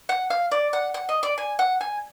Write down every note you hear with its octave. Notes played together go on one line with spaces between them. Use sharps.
F#5
F5
D5
F#5
F#5
D#5
D5
G#5
F#5
G#5